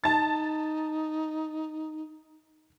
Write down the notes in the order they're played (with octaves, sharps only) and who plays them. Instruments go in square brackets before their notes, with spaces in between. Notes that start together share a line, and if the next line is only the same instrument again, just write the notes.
[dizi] D#4 [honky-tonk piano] A5 A6